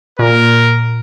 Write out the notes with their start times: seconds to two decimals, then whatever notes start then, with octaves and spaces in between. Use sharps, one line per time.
0.19 A#2 A#4